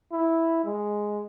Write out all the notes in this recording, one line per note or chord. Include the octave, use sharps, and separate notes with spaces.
E4
G#3